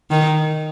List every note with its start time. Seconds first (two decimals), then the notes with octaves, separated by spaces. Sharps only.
0.11 D#3